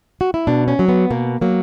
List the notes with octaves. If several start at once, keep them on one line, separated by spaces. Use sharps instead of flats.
F#4
E4
B2 D4
C#4
F#3
B3
B2 A#3
F#3 A#3